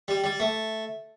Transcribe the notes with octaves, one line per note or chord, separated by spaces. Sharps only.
G3
G3
A3